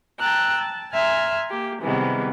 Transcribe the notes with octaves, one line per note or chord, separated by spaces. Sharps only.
G5 A5 A#5 E6 F#6
A5
E5 G#5 A#5 C6 F6
A#3 G4
C3 D#3 E3 G3 G#3 B3